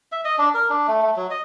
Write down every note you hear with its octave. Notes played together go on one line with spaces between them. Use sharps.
E5
D#5
D4
A#4
D4
A3
A3
F#3
D#5